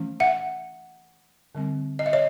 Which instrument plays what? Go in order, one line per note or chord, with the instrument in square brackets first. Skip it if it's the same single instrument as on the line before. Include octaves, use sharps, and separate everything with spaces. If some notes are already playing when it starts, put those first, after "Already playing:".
Already playing: [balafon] E3 A3 C#4
E5 F#5
D3 G3 C4
D#5
E5
C#5 D#5